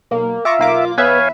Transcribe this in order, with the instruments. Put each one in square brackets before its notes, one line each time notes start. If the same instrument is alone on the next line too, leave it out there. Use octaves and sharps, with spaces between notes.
[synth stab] B1 [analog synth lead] A#3
[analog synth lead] F4 [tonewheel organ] E5 [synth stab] A#5 C#6 D6
[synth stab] B1 A#3 D6
[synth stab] E2 B4 E5 [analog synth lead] B3 [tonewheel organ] C#5 F5 G#5